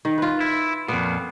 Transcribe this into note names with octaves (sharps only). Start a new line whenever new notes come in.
D#3
F4 B4
E4
F2 A#2 B3